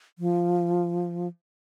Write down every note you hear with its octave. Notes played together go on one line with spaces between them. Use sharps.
F3